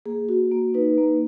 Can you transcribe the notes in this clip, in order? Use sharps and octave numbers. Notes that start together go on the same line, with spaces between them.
A#3 G#4
F#4
A#3
D#4 B4
A#3